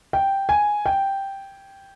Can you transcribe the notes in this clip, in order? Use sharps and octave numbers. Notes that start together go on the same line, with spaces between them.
G5
G#5
G5